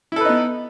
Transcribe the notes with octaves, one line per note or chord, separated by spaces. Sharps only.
B3 D#4 E4 A4 B4